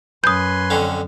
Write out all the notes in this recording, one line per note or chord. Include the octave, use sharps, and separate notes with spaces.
F#2 B4 G#5 C6 D#6 G6
F2 D3 C#4